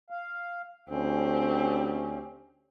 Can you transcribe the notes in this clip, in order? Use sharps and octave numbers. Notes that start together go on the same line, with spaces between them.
F5
D2 C4 C#4 G4